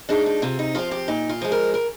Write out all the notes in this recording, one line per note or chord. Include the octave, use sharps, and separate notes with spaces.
F3 G#3 D4 D#4
D#4
C3 F4
D#4
F3 C4 F4
G4
A#2 D#4
F4
F3 G#3
A#4
A#4